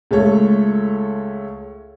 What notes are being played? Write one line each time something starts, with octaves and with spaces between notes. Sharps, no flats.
C#2 A3 A4 C#5